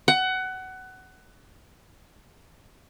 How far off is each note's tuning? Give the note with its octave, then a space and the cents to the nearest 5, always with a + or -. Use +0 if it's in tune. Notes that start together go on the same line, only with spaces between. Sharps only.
F#5 +20